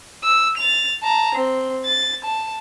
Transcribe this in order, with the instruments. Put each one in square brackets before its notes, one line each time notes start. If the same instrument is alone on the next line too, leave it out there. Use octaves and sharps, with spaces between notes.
[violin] E6
A6 F7
A5 A#5
C4
A6
A5